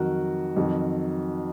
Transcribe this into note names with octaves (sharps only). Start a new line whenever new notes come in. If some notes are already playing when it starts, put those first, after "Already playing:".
Already playing: F2 D#3 F#3 F#4 A#4
F2 D#3 F#3